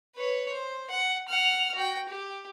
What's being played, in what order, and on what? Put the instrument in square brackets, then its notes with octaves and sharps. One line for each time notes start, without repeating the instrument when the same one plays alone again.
[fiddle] B4 C#5
C5
F#5
F#5 F6
F#4 G5
G4